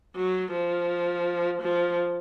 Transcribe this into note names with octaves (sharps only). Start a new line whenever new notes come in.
F#3
F3
F3